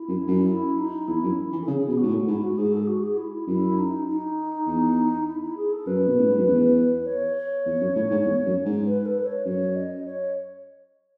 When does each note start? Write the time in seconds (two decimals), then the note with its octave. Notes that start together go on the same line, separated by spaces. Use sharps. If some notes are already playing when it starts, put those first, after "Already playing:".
Already playing: E4
0.08 F#2
0.27 F#2
0.48 E4
0.78 D#4
1.07 E2 E4
1.23 F#2
1.53 E3
1.62 A4
1.68 C#3 G#4
1.86 B2 G#4
1.97 F#4
2.03 G#2
2.08 A2
2.27 G#2 E4
2.43 F#4
2.57 G#2 G#4
2.72 A4
2.80 G#4
2.87 F#4
3.03 G#4
3.17 E4
3.32 E4
3.47 F#2 E4
3.77 D#4
4.07 D#4
4.67 E2
5.27 E4
5.42 E4
5.56 G#4
5.72 A4
5.86 F#2 B4
6.07 B2
6.17 A2
6.27 G#2
6.37 F#2
6.46 E2
7.06 C#5
7.36 C#5
7.66 E2
7.81 F#2
7.96 A2
8.11 G#2
8.25 E2
8.46 F#2
8.65 G#2
8.86 B4
9.05 A4
9.19 B4
9.25 C#5
9.45 F#2 C#5
9.75 D#5
10.05 C#5